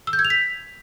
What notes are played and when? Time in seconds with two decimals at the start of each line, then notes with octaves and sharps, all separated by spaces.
0.07 E6
0.13 G6
0.19 G#6
0.25 F7
0.30 B6